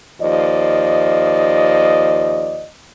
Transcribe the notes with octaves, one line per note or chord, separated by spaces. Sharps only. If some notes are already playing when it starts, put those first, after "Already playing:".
D#2 F3 D5 D#5